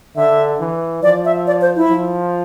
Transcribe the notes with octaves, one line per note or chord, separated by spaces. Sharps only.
D3 E5
E3
F3 D5
E5
D5
C5
E4
F3